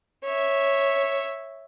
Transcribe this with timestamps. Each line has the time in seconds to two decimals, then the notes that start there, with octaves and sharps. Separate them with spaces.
0.24 C#5 E5